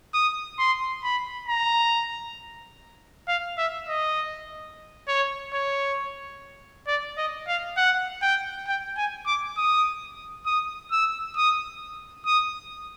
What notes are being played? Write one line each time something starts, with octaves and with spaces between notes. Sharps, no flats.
D#6
C6
B5
A#5
F5
E5
D#5
C#5
C#5
D5
D#5
F5
F#5
G5
G5
G#5
D6
D#6
D#6
E6
D#6
D#6